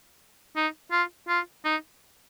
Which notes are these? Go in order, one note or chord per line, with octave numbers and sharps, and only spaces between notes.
D#4
F4
F4
D#4